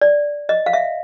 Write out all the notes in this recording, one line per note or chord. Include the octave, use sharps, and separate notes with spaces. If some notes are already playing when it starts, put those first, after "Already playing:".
D5
D#5
F5
E5